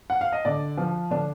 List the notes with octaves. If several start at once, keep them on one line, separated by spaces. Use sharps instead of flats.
F#5
F5
D#5
D3 D5
F3
D3 D4